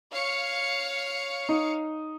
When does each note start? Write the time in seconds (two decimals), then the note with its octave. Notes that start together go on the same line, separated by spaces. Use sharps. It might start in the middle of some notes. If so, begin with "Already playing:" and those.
0.12 C#5 F5 C#7
1.49 D#4